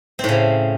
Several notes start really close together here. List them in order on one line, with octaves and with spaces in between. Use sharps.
C4 A2 C#3